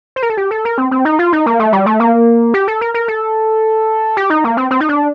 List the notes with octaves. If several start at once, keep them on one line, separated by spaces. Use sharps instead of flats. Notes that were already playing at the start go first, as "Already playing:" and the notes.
C5
A#4
A4
G4
A4
A#4
C4
C4
D#4
F4
D#4
A#3
A3
G3
A3
A#3
G4
A4
A#4
A#4
A4
G4
D#4
A#3
C4
C4
D#4
D4